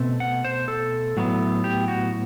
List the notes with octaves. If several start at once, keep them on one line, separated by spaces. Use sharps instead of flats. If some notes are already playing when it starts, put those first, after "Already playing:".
Already playing: B2 A3 C4
F#5
C5
A4
A2 F#3 B3
G4
F#4